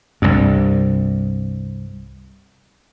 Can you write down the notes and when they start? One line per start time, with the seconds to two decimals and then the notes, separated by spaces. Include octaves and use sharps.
0.22 C2 G2